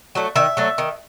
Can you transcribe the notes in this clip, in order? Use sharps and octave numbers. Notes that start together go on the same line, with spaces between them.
F#3 A3
D#3 E5
F#3 A3
D#3